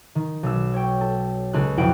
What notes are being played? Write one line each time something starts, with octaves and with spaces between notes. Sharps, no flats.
D#3
B1 E6
C#5 G5
A4
C#2 A4 C6 F#6
B1 F2 E4 F#5 G5 D7